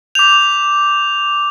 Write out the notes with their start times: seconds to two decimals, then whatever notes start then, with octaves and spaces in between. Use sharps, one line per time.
0.15 D6 G6 F7